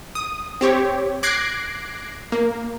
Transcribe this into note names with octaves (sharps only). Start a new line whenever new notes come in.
D#6
C4 G4 C#5
D6 F#6 G#6 A#6 C7 D7
A#3